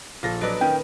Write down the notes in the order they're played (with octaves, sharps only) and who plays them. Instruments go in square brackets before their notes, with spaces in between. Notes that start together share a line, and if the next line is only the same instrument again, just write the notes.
[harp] A#1 A4 [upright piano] F4 A#6
[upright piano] F#3 D5 [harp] B4 D#5 D7
[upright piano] D#3 C#4 [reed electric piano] G5